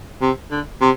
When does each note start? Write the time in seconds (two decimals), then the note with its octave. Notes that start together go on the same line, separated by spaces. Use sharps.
0.22 C3
0.51 D3
0.81 C3